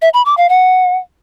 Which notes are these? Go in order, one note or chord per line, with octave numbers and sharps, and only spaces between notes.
E5
B5
D6
F5
F#5